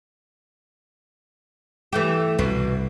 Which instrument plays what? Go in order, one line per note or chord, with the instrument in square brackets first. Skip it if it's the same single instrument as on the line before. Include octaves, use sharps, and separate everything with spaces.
[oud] E3 A3 G4
[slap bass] C2 [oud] B2